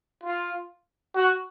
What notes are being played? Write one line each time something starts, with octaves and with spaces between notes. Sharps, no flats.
F4
F#4